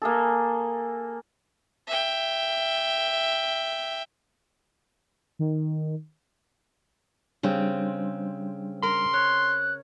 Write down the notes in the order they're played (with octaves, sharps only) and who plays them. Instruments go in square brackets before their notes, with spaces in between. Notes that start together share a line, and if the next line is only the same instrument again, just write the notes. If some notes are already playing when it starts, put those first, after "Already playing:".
[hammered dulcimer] A#3 G#4 A4
[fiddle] E5 G5
[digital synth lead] D#3
[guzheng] C#3 C4 [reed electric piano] G3 D4
[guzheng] A#4 [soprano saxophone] C6
[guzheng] C#5 [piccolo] F#6